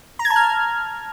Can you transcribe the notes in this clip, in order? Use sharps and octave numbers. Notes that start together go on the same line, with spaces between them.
A#5
G#6
A5
F6